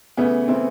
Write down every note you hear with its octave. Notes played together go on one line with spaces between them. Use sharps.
C#3 E3 A3 B3
C#3 E3 A3 C4